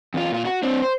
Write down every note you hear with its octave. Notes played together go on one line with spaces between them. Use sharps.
E2 F4
A#2 F4
F#4
C4 D4
C5